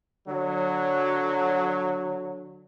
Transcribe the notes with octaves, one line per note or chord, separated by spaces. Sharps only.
D3 F#3